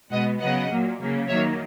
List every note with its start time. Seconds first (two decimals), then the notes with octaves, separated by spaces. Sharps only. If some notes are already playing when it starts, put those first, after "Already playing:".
0.12 B2 G#3 B3 D#5 F#5
0.40 C#3 F#3 B3 D#5 F#5
0.70 A#2 F#3 A#3
1.00 C#3 F#3 A#3
1.28 D#3 F#3 A#3 C#5 E5